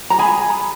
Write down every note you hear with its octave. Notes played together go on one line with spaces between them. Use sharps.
A#5
G#4 G#5 B5